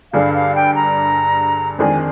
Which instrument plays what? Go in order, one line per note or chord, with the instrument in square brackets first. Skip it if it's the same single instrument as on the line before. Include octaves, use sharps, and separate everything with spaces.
[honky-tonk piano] G2 D3 G3 D4 G#4 [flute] F5
[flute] F5
G5
A#5
[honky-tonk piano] F2 D#3 G#3 D4 G#4 [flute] G#5